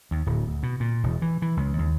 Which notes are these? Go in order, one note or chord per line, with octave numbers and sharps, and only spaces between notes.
D#2
D1
D2
B2
A#2
E1
E3
E3
C#2
D#2